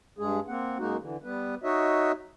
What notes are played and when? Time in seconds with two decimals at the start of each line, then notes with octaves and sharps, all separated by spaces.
0.19 G2 G#3 G#4
0.48 A#3 C4 F#5
0.79 F#2 G#3 A#3 D#4 F#4
1.00 D3 E3
1.24 G3 B3 B4
1.63 D#4 F#4 C#5 D#5 E5